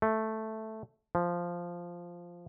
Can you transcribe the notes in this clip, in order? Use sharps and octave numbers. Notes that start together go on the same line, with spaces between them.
A3
F3